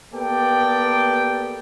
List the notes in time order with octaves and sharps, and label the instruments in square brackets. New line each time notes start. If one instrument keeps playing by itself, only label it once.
[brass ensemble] A#3 B3 G4 A4 D5 G5